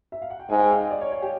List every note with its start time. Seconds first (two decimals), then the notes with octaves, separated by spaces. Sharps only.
0.12 E5
0.22 F5
0.30 F#5
0.39 G5
0.50 G#2 G#5
0.59 G5
0.71 F5
0.81 D#5
0.91 D5
1.01 C#5
1.11 C#5
1.22 G4